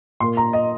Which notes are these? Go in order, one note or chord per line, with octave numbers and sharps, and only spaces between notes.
A#2 A#3 C6
A#5
D#5